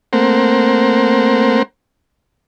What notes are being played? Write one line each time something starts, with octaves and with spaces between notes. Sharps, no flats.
A3 A#3 C4 A#4 C5 F#5